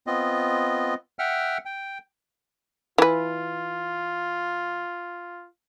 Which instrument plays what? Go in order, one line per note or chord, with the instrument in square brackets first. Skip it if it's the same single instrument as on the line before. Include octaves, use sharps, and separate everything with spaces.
[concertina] B3 C4 F4 D#5
E5 F#5 G5 F6
G5
[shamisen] E3 B4 [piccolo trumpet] F4